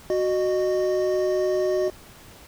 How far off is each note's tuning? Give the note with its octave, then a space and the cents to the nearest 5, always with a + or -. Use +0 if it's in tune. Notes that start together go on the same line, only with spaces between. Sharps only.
F#4 +0 D#5 -25